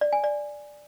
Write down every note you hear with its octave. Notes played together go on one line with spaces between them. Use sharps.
D5
G#5
D5